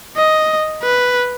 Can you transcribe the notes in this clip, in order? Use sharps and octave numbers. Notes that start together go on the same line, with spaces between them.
D#5
B4